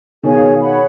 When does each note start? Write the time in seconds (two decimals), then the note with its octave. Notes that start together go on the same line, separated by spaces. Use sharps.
0.23 B2 D#3 G#4 C#5 F5 G#5
0.61 G#4 C#5 F#5 B5